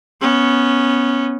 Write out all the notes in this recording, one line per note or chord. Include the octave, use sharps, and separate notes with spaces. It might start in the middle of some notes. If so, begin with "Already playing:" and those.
B3 C#4